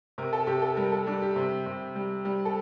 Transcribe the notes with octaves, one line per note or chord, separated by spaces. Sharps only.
C3 A#4
A4
C3 G4
A4
G3 A#4
A4
G3 D4
G4
C3
C3
G3
G3
A4